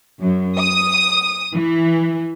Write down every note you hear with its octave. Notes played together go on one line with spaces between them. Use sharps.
F#2
D#6
E3